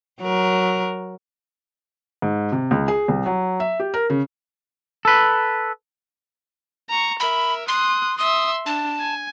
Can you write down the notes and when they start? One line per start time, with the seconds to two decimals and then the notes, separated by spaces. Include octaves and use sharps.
0.22 F#3 A#4
2.22 G#2
2.52 C3
2.71 C#2
2.88 G#4
3.08 C2
3.26 F#3
3.60 E5
3.80 G4
3.94 A#4
4.10 C#3
5.05 A4 B4
6.89 A#5 C#6
7.20 A#4 E5 B5
7.68 C6 D#6 F#6
8.18 E5 C6 D#6
8.66 D4 A5
9.00 G#5